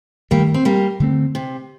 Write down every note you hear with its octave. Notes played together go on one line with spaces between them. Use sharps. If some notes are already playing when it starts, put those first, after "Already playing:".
G2 D#3 G3 A3 A#3
C4
G3 A#3
D3 A3 C4
C3